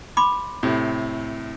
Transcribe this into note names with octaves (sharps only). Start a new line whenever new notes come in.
B5 C6 D6
A2 C3